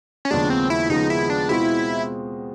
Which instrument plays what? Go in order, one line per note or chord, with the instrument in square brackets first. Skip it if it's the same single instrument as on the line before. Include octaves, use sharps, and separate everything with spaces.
[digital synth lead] C#4
[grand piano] D#2 C#3 F3 G#3 B3 [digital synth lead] D4
[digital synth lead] C4
E4
[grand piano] D#2 C#3 F3 G#3 B3 [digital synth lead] D#4
[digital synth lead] E4
D4
[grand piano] B2 G#3 C4 F4 [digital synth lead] E4